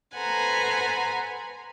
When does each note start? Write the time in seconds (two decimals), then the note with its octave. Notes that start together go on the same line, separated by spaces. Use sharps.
0.15 A4 B4 C5 F#5 G#5 A#5